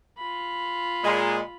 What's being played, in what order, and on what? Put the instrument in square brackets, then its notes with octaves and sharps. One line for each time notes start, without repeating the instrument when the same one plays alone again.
[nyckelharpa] F4 B5
[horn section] A#2 G#3